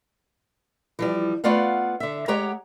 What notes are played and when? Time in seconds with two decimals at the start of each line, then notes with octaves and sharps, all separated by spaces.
0.99 E3 F3 G3
1.44 A3 B3 F4 D5 F5 F#5
2.00 D3 E5
2.28 G#3 G4 C#5 F#5 A#5